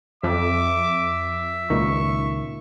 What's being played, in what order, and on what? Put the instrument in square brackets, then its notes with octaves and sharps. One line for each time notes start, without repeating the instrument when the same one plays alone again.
[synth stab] F2 [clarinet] E5 [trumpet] D6
[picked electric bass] C#2 A#2 D#3 [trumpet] C#6